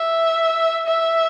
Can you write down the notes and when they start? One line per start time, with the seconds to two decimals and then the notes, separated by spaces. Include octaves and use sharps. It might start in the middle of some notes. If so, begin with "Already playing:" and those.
Already playing: E5
0.87 E5